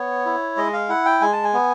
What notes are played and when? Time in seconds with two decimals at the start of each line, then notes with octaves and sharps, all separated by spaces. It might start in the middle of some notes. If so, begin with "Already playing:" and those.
Already playing: B3 C#5
0.26 E4
0.57 G#3 D#5
0.73 F5
0.89 E4 F#5
1.06 G5
1.21 G#3 G#5
1.33 A5
1.44 G#5
1.53 B3